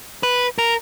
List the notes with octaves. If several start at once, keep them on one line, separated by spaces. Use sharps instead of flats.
B4
A#4